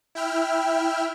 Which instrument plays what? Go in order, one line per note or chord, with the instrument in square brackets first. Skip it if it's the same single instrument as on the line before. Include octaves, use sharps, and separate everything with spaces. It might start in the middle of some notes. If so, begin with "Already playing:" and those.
[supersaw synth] E4 E5 G5 F6